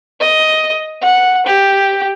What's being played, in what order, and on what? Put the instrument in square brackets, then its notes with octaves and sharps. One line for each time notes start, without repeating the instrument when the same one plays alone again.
[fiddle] D#5
F#5
G4